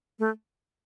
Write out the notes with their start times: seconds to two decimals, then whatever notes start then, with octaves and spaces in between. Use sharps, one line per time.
0.19 A3